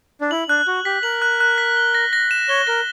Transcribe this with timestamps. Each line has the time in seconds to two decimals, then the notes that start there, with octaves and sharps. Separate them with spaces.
0.21 D4
0.31 E4 F#7
0.49 D4 F#6
0.67 F#4 F#6
0.85 G4 B6
1.03 A#4 F#7
1.22 F#6
1.40 F#6
1.58 B6
1.77 G7
1.95 A#6
2.13 A#6
2.31 E7
2.49 C#5 G7
2.67 A#4 A#6